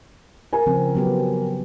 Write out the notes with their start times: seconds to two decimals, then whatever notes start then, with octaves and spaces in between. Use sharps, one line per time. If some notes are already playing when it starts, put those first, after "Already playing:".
0.53 A#4 G#5
0.66 C#3 F3 C4
0.95 F#3 B3 G4